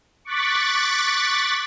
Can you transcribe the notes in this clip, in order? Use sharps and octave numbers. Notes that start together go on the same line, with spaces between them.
C#6 D6 F#6 A6 B6